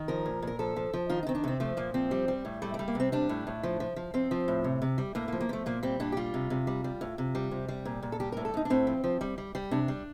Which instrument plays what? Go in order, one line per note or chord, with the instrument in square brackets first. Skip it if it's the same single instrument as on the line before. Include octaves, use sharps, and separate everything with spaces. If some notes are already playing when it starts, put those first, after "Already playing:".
Already playing: [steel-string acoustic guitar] D#3
F3 A#4
A#2
A#2 A#4
F3 A4
F3
F3
D#3 F4
D#4
D#3 C4
D4
C3 C4
F3 A3
A#2 A#3
F3 C4
G3
G3
A2
G3 A3
A3
G3
A#3
C3 C4
G3 D4
A2
A2
F3
F3
F3
F3 C4
F3
A2
C3
C3
G3
A2 A#3
A#3
F3
A#3
F3 A3
A#2 A#3
G3 C4
A#2 D4
G4
G3 F4
C3
C3
G3
G3
A2
C3
G3
C3
G3
A#2
A#2
A4
G3 G4
A#4
A2
A4
A2 D#4
D4
A2 C4
F3
F3
G3
G3
G3
C3 D4
G3